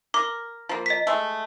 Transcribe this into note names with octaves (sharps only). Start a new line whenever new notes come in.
A#4 D6
F3 A#3
D#5 B6
G#3 A3